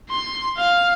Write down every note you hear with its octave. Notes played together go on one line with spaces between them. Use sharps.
C6
F5